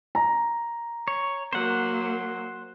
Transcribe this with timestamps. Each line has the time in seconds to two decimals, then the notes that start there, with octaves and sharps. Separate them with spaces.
0.15 A#5
1.08 C#5
1.53 F#3 A#3 C5 F#5